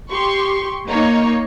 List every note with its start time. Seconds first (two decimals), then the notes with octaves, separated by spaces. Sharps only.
0.12 G4 C6 C#6
0.88 A#3 D#4 C#5